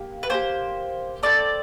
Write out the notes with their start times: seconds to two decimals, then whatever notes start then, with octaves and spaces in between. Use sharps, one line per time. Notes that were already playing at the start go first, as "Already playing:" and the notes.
Already playing: A#3 G4
0.23 B4
0.30 A#3 D4 G4 C5
1.23 C4 F4 A4 D5